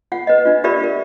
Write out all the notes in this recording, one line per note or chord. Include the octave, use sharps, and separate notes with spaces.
F4 F#5
B4 D#5
D4 F4
F4 G4 A#4 D5 E5 B5
F4 A#4